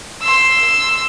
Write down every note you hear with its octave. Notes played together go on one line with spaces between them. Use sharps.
C6 E6